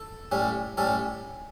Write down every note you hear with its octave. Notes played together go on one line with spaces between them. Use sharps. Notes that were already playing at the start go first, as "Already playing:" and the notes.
Already playing: A4
A2 G3 C#4
A2 G3 C#4 A4